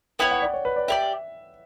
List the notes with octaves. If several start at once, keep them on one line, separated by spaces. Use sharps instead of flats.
B3 E4 A#4 C#5 G5
F#5
D5
C#5
B4
D5
G4 A#4 D5 E5